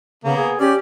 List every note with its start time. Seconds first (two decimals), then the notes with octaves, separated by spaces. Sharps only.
0.24 C#3 A#3 B3
0.37 G#4
0.60 C#4 G4 D5